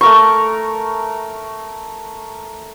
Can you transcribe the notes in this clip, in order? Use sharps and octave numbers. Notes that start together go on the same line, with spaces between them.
A3 A#4 C#6